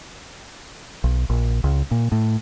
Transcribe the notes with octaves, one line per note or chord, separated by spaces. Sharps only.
B1
A#1
C#2
A#2
A2